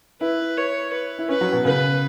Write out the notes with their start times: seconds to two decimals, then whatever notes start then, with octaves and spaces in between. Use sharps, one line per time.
0.21 E4 B4
0.57 C#5
0.93 B4
1.19 E4
1.29 C#4 B4
1.41 F#3
1.53 B2
1.65 C#3 B4